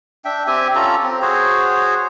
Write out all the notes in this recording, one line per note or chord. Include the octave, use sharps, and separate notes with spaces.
D4 E5 G5
C4 G4 E5 G#5
C#4 F4 A4 A#5
C4
F#4 G#4 C5 C#5